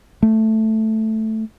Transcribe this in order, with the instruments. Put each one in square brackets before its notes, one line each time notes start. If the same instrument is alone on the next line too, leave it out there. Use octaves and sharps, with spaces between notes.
[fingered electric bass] A3